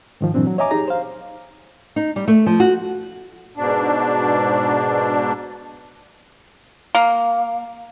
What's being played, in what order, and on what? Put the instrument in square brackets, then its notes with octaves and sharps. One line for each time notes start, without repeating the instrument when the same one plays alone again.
[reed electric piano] G#2 D#3 F3
G2 A#2 E3 F#3 C4 D4
F#3
C#5 D#5 E5 G#5 A#5 D6
D#4 G4 G#4 A#5
C5 F5
[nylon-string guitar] D#4
G3
A3
F3
F#4
[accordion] G#2 B2 D4
[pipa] A#3